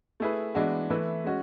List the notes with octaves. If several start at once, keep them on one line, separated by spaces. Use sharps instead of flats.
A3 E4 G#4 B4
E3 G#3 B3 D4 F#4
E3 A3 E4 B4
G#3 C#4 F#4